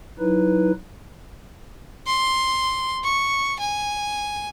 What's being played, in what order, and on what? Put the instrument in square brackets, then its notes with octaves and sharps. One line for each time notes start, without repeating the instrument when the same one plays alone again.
[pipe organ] F#3 D#4 E4 B4
[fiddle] C6
C#6
G#5